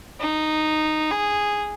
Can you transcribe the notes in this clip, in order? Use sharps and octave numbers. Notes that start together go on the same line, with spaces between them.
D#4
G#4